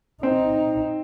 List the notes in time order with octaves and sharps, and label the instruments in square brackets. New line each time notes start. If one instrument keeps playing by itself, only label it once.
[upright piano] C4 [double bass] D#4